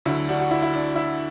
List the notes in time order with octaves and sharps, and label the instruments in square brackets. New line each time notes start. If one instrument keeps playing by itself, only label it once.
[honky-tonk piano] D2 D3 F#3 E4
D4 F#4
F#4
E4
E4
D4
E4